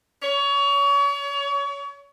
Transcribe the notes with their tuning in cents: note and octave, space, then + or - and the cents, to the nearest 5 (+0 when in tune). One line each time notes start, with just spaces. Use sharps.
C#5 +30